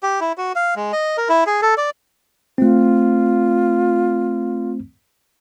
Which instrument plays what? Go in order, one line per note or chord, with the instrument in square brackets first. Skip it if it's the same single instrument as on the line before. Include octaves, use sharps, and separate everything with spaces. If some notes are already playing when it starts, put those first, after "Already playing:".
[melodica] G4
E4
F#4
F5
G#3
D#5
A#4
E4
G#4
A4
D5
[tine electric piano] A3 C4 [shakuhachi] F4